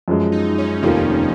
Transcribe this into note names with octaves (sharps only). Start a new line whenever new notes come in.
F#2 F3 G#3
D#4
C#4
F1 D#2 D#3 F3 A#3 F4